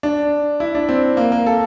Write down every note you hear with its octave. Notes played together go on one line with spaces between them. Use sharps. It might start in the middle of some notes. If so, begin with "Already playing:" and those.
D4
E4
D4
C4
A#3
A#3
A4